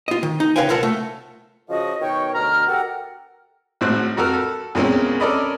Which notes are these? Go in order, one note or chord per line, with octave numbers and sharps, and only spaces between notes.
F4 D#5
D#3
D#4
C#3 B4 C#5 F5 G5 G#5
C2 C3 F4 A#4 F#5 A5
A3
C#3 F3 F#4 D#5
B2 D#3 C#5 G5 C#6
D2 B2 A#5 F6
F#4 G4 A4 A#4 F#5 G5
G#1 A2 F#4 C5 F#6
F2 F#4 A4 A#4 F6
A4
E2 A#2 G#3 A#3 C4 C#4
C#4 A4 A#4 D5 D#5 B5